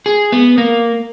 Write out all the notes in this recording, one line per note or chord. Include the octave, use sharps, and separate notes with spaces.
G#4
B3
A#3